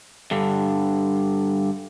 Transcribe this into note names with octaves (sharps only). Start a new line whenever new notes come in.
G2 D3